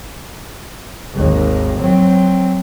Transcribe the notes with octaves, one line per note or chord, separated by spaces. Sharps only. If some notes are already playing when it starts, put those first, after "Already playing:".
G#1 D#2
F#3 C4